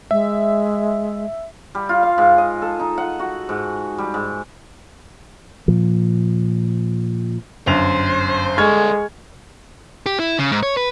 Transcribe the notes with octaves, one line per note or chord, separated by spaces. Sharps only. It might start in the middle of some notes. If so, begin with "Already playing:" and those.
G#3 E5
G3
F4
F5
G#2
D#5
A4
D#4
F#5
F#4
G#2
G3
G#2
A#2 F3
G1 F#2 C5 F7
G3 G#3 A4 C#6 F6 G#6
G4
E4
C#3
G#2
C#5
B4